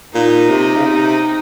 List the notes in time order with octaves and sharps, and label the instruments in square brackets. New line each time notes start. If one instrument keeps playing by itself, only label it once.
[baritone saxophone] A#2 [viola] D#4
[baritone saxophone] C3
C#3
C3